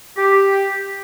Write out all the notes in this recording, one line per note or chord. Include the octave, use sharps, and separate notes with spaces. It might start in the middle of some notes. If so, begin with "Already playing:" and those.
G4